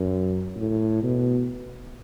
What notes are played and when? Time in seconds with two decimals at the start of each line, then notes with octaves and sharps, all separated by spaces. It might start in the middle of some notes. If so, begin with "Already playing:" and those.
Already playing: F#2
0.56 A2
1.03 B2